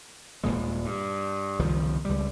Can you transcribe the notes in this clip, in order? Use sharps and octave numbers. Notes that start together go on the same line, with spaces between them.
D#1 D#2 A#2 G#3
G2
F#1 C2 D#3 F3
C#2 G3